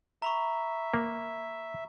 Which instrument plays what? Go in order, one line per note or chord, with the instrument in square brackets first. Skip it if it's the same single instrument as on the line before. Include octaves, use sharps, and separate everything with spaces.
[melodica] E5 [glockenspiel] A#5 B5 C#6
[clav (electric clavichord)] A#3